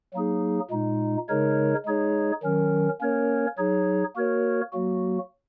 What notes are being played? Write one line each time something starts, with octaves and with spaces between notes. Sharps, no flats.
F#3 A#3 D#4 G#4
A#2 G#3 D#4
C#3 G#3 D#4 A#4 C#5
G#3 D#4 G#4 C#5
D#3 F#3 C#4 A#4
A#3 C#4 A#4 C#5
F#3 D#4 G#4 C#5
A#3 F#4 A#4 C#5
F#3 A#3 F#4